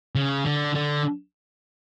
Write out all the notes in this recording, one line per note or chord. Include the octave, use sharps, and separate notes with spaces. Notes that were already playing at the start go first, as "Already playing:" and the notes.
C#3
D3
D3